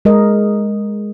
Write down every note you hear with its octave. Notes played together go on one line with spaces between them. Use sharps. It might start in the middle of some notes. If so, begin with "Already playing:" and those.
G#3 A#4 D#5